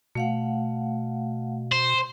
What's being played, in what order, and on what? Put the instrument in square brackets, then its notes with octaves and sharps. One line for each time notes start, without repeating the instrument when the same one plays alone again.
[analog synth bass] B2 [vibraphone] A3 F5 F#5
[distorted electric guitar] C5